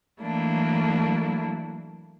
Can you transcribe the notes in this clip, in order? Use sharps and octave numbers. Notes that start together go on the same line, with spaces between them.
E3 F#3 A3 A#3 D4 E4